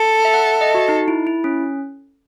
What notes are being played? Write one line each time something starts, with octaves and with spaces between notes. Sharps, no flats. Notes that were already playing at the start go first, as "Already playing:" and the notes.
Already playing: A4
E5
F#5
E5
D#5
F#4
D#4
E4
E4
C#4